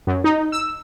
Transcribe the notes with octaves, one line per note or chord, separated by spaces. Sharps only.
F#2
D#4
E6